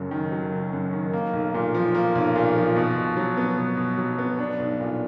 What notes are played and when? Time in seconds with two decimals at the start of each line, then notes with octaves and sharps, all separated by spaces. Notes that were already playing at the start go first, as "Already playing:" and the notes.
Already playing: F#1 F#2 F#3
0.11 D#3
0.32 F#3
0.52 F#1
0.73 F#2
0.93 D#3
1.13 A#3
1.33 B1
1.54 A#2
1.75 F3
1.95 A#3
2.15 B1
2.36 A#2
2.55 F3
2.76 B2
2.96 B2
3.17 F#3
3.37 B3
3.57 B2
3.77 B2
3.98 F#3
4.18 B3
4.39 D4
4.60 B1
4.80 A#2